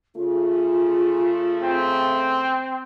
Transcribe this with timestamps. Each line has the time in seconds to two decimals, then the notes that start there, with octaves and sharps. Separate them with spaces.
0.16 C#3 A3 F4
1.63 C4